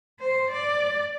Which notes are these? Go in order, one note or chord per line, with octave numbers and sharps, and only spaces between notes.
C5
D5